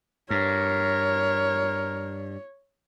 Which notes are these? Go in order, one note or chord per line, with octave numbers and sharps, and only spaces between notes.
G2 A#4 C#5